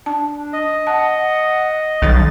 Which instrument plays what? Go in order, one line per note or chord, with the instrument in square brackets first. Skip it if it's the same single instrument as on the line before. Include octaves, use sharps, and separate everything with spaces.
[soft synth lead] D4 [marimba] A5
[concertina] D#5
[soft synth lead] F#5 [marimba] A5
[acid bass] B1 [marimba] D#3 G3 [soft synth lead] A6